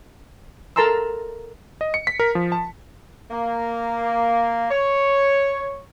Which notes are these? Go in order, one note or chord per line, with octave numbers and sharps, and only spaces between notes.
A4 A#4 A5 A#5 C6 E6
D#5
C#7
B6
A#4
F3
A5
A#3
C#5